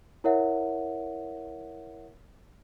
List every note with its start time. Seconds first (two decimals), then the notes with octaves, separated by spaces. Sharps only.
0.24 E4 A#4 C#5 E5 F#5